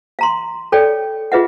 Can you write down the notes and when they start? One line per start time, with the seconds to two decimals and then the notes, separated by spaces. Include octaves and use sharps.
0.19 F5 A#5 C6
0.72 A4 C#5 D5 F5 G5
1.32 F4 G#4 B4 D#5 E5 F#5